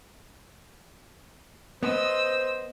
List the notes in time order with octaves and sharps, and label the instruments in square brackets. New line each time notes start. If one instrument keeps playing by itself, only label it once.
[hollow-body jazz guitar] B3 [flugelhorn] C5 [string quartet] D#5 E6